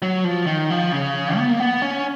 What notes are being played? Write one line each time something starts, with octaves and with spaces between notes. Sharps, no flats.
F#3
F3
D#3
F3
C#3
B3
A#3
B3
C#4